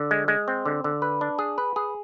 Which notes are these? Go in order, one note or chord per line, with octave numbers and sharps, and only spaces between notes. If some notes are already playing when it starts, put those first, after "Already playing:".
Already playing: D3
G#3
G#3
C4
D3
D3
B4
D4
G#4
B4
G#4